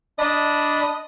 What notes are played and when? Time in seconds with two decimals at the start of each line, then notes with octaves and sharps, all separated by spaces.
0.19 D4 D5 D#5 B5